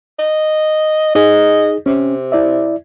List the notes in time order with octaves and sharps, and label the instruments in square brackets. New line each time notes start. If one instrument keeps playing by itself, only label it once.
[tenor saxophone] D#5
[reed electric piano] D#4 G#4 [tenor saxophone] D#5
[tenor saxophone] C3 [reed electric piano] C#4
[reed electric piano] E4 D5 E5